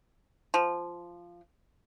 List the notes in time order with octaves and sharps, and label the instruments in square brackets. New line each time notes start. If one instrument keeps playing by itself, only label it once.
[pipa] F3